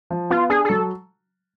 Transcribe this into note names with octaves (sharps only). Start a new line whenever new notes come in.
F3
B3 F4
D4 G#4
G#4
F#3 A4